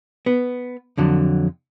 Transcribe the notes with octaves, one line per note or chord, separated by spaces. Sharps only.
B3
F2 D3 F#3